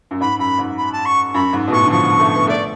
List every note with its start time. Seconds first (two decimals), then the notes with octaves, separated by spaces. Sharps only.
0.11 F#2
0.20 G#2 B5
0.39 F#2 B5
0.58 G#2
0.77 B5
0.92 A5
1.05 C#6
1.34 F#2 B5
1.53 G#2
1.68 B2
1.72 A2 C#6
1.85 D3
1.91 F3 C#6
2.19 A3
2.34 B3
2.47 A3 D5